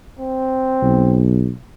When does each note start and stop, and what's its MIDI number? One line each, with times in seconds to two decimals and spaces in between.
0.19 1.24 60
0.82 1.52 35